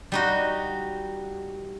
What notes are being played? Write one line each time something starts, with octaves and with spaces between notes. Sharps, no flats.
G3 D#4 F#4